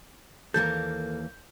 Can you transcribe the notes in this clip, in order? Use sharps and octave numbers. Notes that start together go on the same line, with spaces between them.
D#2 E3 A#3 A4 A#4 G6